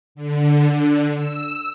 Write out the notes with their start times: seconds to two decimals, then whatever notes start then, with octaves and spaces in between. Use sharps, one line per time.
0.15 D3
1.14 E6